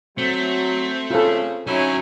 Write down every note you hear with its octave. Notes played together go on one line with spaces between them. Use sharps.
F#3 A3 C4
C#3 F4 A4
D2 F#3 C#4 D#4 E4 G#5